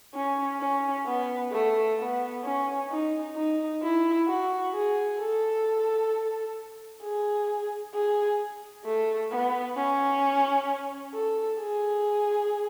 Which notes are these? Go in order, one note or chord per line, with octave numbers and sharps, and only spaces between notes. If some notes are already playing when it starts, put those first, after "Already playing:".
C#4
C#4
B3
A3
B3
C#4
D#4
D#4
E4
F#4
G#4
A4
G#4
G#4
A3
B3
C#4
A4
G#4